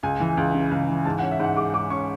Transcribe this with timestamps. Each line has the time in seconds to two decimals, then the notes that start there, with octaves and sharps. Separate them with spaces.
0.03 C#2 G#5
0.20 E3
0.37 C#2
0.55 C#3
0.71 C#2
0.88 E3
1.05 G#2 A5
1.19 F#5
1.22 C#4
1.31 E5
1.40 G#2 F#5
1.57 G#3 D6
1.73 G#2 D6
1.90 C#4 C#6